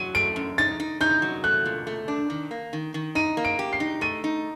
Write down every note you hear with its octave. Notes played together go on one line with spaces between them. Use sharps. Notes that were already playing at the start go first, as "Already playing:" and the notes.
Already playing: F#3 D#7
A3 D7
F#2
D#4 A6
D#4
D#4 G6
F#3
A3 F#6
A#2
A3
D4
D#3
A#3
D#3
D#3
D#4 D#7
A#3
D7
G4
C7
D#4
A3 D#7
D#4